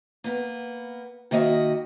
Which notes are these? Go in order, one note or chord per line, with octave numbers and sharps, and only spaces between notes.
A#3 B3
D#3 A#3 F#4 D#5 E5